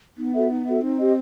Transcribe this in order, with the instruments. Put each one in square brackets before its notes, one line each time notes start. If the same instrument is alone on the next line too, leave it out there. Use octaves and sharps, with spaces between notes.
[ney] B3 [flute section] D#4
[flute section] F#4 A4 E5
D#4
F#4 A4 E5
[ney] C4 [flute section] D#4
[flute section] G4 D#5